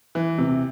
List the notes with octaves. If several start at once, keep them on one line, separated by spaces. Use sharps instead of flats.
E3
C3